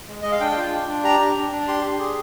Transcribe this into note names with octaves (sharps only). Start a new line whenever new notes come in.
G#3
G#3 D#5
F5
D4 G5
F4
D4
D4
G4 A#5
D4
D4
D4
G4 C6
G4
G#4